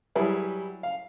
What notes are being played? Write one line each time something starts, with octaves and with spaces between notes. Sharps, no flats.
F#3 G3 E4 G#4 B4
F5